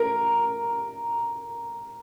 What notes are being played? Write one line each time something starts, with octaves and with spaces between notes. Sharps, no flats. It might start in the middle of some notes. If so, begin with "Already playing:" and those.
Already playing: A#4